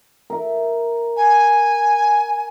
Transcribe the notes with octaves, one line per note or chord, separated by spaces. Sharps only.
A#4 E5
G#5